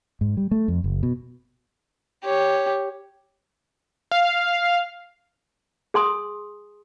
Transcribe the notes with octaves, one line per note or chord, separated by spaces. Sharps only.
G#2
G3
A3
F2
F#1
B2
G4 C#5
F5
G#4 G#5 C6 D#6